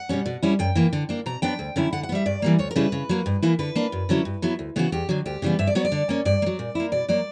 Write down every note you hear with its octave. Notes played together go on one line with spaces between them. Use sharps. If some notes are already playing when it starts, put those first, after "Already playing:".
Already playing: F#5
B2 G3 C#4
B2
G3 C#4 E4
F#2 G5
E3 A#3
D3
A#3 D4
B2 A#5
F#3 B3 D4 G5
D2
D3 F#3 C#4 E4
D3 F#5
F#5
B3
G3 E5
G2 D5
E3 G3 A#3
D2 C#5
A#4
C#3 G3 C#4 E4 B4
C#3
F#3 A#3
G2
E3 A#3 E4
D3 B4
A#3 D4
F#2
D3 F#3 C#4 E4
G2
F#3 B3 E4
D2
C#3 E3 B3 F#4
E2 G4
D3 F#3
D2 G4
C#3 E3 G3 B3
G2 E5
D5
F#3 B3 C#5
D5
D3
A#3 C#4
G2 D5
A#3
F#3
A#2
A#3 E4
B2 D5
F#3 A#3 D5